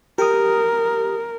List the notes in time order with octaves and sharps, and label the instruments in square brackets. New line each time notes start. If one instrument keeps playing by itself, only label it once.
[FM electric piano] G4 D#6 [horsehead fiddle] A#4